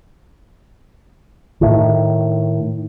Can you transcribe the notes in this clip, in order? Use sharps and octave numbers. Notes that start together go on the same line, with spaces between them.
A2 D#3